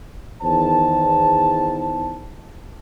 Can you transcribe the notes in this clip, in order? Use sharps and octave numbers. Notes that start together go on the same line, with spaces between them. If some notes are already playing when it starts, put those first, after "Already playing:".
E2 D#3 C5 A5